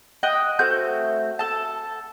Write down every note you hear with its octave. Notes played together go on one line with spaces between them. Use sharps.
D#5 F#5 G5 F#6
A3 C4 F#4 G6
A4 A5